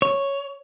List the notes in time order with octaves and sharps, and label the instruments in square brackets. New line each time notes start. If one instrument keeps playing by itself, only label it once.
[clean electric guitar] C#5